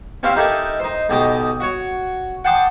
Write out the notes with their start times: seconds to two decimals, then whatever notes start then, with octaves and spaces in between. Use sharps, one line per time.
0.23 C4 C#4 E4 G4 C5 F5
0.36 D#4 E4 G4 A4 A#4 G#5
0.80 D#4 C5
1.09 B1 B2 G4 D#5 D6 D#6
1.60 F#4 C#5
2.45 F#5 G5 A5 C6 D6 D#6